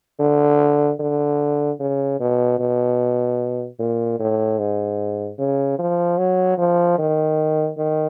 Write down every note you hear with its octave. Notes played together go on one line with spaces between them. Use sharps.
D3
D3
C#3
B2
B2
A#2
A2
G#2
C#3
F3
F#3
F3
D#3
D#3